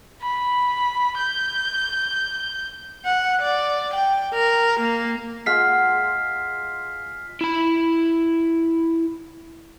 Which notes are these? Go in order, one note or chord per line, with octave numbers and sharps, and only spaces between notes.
B5
G6
F#5
D5
G5
A#4
A#3
G#3 F4 F#5 F6 B6 C7
E4 B5